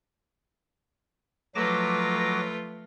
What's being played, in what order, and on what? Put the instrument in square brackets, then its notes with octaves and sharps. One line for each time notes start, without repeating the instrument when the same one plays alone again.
[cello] F3 B4 [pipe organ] F#3 D6 A#6 [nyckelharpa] A3 F4